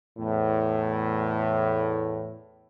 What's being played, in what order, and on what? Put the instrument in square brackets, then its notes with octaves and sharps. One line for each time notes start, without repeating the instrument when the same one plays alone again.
[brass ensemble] E2 A2